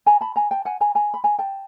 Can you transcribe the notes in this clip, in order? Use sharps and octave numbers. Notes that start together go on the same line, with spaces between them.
G#5 A#5
A5 B5
G#5 A#5
G5 A5
F#5 G#5
G#5 A#5
G#5 A#5
B5
G#5 A#5
G5 A5